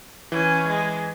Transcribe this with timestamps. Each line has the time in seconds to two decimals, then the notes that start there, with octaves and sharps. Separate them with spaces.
0.32 E3 C#4
0.67 G#3